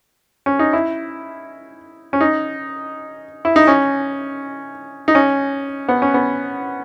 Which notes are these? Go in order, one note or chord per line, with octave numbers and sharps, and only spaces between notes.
C#4
D#4
E4
C#4
D#4
E4
D#4
C#4
D#4
C#4
B3
C#4
B3